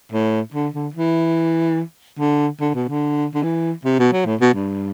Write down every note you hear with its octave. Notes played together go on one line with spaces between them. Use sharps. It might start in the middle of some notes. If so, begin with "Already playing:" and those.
A2
D3
D3
E3
D3
D3
B2
D3
D3
E3
C3
B2
F#3
A2
B2
G2